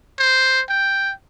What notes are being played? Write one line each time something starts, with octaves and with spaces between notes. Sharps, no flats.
C5
G5